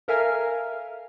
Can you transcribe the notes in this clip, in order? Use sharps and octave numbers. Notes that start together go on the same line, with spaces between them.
A4 A#4 E5 F5 G#5 F6